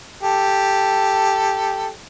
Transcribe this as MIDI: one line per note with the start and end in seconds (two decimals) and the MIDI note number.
0.23 1.91 67
0.23 1.91 69